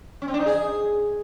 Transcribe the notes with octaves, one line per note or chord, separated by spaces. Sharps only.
C#4
C4
D4
D#4
G#4